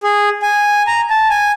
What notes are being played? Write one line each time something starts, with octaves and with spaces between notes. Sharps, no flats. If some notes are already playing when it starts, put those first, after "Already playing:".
G#4
G#5
A#5
A5
G#5